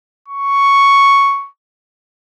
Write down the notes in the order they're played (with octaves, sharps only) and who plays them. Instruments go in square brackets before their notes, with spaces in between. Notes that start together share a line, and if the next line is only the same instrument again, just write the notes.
[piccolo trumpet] C#6